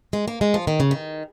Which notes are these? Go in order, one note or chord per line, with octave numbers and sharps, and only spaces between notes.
G#3
A#3
G#3
F3
D#3
C#3
D#3